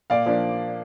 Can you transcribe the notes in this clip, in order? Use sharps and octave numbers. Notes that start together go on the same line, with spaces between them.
A#2 D5 F5
F3 A#3 D4